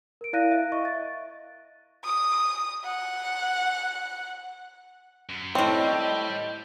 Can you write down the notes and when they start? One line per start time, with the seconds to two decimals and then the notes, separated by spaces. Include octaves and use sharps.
0.21 A#4 D7
0.33 E4 D5 F5 F#6 A#6 D#7
0.52 E5
0.72 D#5 E5 C#6
0.85 A6
2.04 D#6
2.85 F#5
5.30 F#2
5.55 A2 G3 C4 C#5 D#5